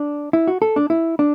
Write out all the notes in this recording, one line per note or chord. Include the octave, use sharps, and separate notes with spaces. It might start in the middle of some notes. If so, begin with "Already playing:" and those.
Already playing: D4
E4
F#4
A4
D4
E4
D4